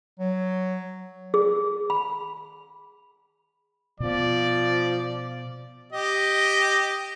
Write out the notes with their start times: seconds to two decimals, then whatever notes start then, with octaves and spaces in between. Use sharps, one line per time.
0.19 F#3
1.34 G#4
1.90 B5
4.00 B2 F3 B3 D5
5.92 G4 D#5